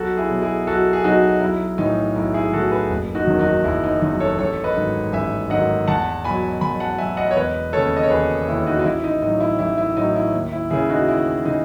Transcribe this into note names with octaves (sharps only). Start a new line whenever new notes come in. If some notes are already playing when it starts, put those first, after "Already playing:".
Already playing: B1 F#4 A4
E4 G#4
B2 F#3
E4 G#4
B1 F#4 A4
G#4
B2 F#3 D#4 F#4
B1 E4
A2 E3 D#4
B1 E4
E4 G#4
A2 E3 F#4 A4
G#4 B4
F#1
D#4 F#4
E2 D#3 F#3
D#4 F#4
F#1 E4
D#4
E2 D#3 F#3 D#4
A4 C#5
A1 A4 C#5
B4 D#5
G#2 D#3 F#3
A1 E5 G#5
G#2 D#3 F#3 D#5 F#5
E2 F#5 A5
B2 F#3 G#5 B5
E2 G#5 B5
F#5 A5
B2 F#3 E5 G#5
D#5 F#5
C#5
E1 B4 D#5
D#2 C#3 A4 C#5
D#5
C#5
E1 G#4 B4
D#2 C#3 E4
D#4 F#4
D#4
A1 E4
D#4
A2 F#3 D#4
E4
A1 E4
E4
A2 F#3 D#4
E4
D#2
E4
C#3 E3 E4 G#4
D#4 F#4
D#2 E4
C#3 E3 D#4